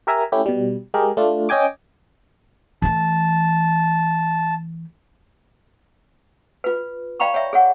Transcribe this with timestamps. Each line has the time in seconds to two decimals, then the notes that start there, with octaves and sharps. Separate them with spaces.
0.07 G4 A#4 E5 G#5 A#5
0.32 A3 C#4 E4 G4
0.46 B2 G3
0.94 G#3 G4 G#4 A#4
1.17 A3 D4 F4
1.49 C#4 D#5 G5 G#5 D6
2.82 E3 A3 A5
6.64 F4 B4
7.20 D5 F5 G5 A#5 B5 C#6
7.34 C#5 E5
7.53 G#4 C#5 F#5